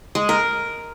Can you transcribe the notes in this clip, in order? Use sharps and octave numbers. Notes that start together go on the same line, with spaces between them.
G#3
A#4